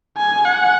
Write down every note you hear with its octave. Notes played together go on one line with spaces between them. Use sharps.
G#5
F#5